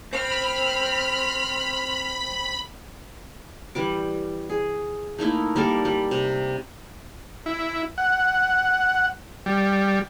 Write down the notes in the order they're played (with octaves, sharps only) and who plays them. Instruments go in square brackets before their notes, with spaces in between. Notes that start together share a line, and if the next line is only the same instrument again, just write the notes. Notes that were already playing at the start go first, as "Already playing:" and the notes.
[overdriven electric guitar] C4 [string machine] B5 [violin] F6
[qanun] E3 G3 D6
G#4
A3 A#3 D#4 E4
G3 A#3 A4 A#4
G3
C3
[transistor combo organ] E4
F#5
G3